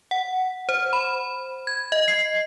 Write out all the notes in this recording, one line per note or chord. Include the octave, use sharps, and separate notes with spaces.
F#5
C5
B5
G#6
D#5
C7